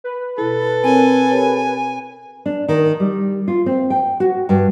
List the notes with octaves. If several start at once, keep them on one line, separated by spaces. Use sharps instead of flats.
B4
B2 E4 A4
C4 A#4 C#5 G#5
G4 A#4 C#5
D4
D#3
G3
F4
C4
G5
F#4
G2